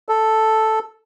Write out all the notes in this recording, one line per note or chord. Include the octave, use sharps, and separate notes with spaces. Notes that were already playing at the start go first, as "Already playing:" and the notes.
A4